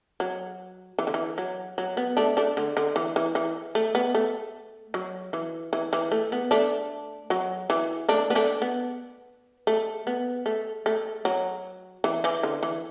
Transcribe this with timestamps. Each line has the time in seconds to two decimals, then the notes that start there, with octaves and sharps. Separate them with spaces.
0.20 F#3
0.99 E3
1.07 D3
1.14 E3
1.38 F#3
1.78 F#3
1.97 B3
2.17 A3 D4
2.37 A3 D4
2.57 D3
2.77 D3
2.96 E3
3.16 E3
3.35 E3
3.75 A3
3.95 B3
4.14 A3
4.94 F#3
5.33 E3
5.73 E3
5.93 E3
6.12 A3
6.32 B3
6.51 A3 D4
7.30 F#3
7.70 E3
8.09 A3 D4
8.30 B3
8.35 A3 D4
8.62 B3
9.67 A3
10.07 B3
10.46 A3
10.86 A3
11.25 F#3
12.04 E3
12.24 E3
12.43 D3
12.63 E3